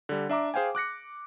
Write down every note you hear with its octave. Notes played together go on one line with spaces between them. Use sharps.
D3 G3
D4 E5 A#5 D6
G#4 C5 F5 G5 G#5
D6 F#6 A#6 C#7